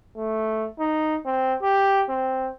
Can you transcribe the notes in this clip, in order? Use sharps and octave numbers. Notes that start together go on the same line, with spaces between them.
A3
D#4
C4
G4
C4